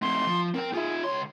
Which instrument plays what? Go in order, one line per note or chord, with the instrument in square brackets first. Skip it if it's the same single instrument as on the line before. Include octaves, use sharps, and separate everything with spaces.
[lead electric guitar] A3 C4 [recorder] C6
[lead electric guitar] F3
[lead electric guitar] C4 G5 [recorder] A#4
[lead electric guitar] F4 E5 [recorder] G#4
[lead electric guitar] C#2 C6 [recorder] C#5